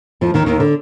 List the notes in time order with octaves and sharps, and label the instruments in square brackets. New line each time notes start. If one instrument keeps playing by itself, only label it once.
[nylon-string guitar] F2 F3
D#2 D#3
D#2 D#3
D3